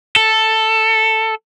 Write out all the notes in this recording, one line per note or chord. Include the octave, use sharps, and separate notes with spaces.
A4